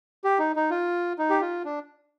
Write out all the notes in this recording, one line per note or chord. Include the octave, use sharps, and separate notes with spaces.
G4
D#4
D#4
F4
D#4
G4
F4
D4